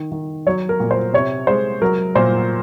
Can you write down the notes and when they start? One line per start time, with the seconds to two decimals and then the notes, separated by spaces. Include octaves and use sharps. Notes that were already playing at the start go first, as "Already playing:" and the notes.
Already playing: D#3
0.12 D#3
0.46 F#3 C#5
0.69 A#4
0.80 A#2
0.91 C5
1.14 C3 C#5
1.47 G#3 C5
1.82 F#3 A#4
2.15 A#2 C5